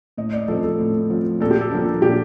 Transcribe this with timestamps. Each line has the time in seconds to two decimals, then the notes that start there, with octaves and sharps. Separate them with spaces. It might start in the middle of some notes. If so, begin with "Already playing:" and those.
0.17 A2 D#5
0.33 D5
0.48 F3 C4 A4
0.64 A4
0.79 A2
1.10 F3 C4
1.40 A#2 A4
1.51 G4
1.61 A4
1.71 F3 A#3 D4
2.02 A#2 G4